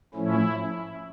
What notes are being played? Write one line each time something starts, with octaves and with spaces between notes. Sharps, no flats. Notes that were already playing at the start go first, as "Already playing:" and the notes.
A2 F3 A3 C#4 E4